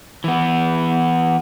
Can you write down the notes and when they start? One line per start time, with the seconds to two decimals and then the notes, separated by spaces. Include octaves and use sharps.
0.24 E3 B3